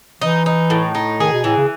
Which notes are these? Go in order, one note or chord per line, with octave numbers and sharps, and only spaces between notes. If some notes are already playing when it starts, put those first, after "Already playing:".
E3 D#4
D#4
A2
D#4
D#3 G#4
B2
A2 E3
C#3